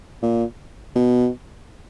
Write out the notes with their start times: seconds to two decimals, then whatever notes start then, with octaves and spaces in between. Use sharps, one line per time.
0.23 A#2
0.96 B2